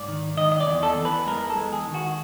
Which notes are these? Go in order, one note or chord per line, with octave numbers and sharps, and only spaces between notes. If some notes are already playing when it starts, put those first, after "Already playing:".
Already playing: G#2 D5
D#3
D#3 D#5
D#5
D5
E2
A4
E2
B4
G#3 A#4
A4
G#3
G#4
D#3
F#4